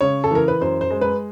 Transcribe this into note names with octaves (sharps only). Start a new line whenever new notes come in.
C#3 C#5
A4
E3 A#4
B4
F#2 C5
C5
G#3
B4